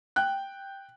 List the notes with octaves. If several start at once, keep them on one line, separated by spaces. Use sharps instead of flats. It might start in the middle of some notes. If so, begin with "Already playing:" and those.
G5 F#6